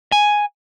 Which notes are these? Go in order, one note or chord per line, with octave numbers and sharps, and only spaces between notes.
G#5